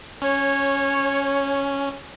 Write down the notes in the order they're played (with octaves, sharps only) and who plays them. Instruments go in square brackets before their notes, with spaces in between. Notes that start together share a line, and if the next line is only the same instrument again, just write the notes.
[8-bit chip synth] C#4 [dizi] C#5